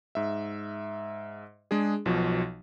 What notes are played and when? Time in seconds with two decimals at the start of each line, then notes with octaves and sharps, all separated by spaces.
0.15 G#2 E5
1.71 G#3 D4 G#4
2.06 B1 B2 F3